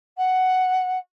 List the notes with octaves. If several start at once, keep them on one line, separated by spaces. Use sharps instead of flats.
F#5